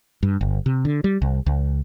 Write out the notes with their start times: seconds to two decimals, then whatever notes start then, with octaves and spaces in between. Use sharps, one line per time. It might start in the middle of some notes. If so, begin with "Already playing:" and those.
0.23 G2
0.41 G1
0.66 C3
0.85 D3
1.04 G3
1.22 C2
1.46 C#2